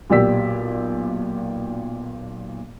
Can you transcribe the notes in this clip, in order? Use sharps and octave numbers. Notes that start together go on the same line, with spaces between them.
B1 A#2 G4 D5 E6 B6